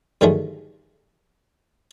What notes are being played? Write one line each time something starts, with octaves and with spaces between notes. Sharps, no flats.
G2 D3 D#3 F#3 G#3 A3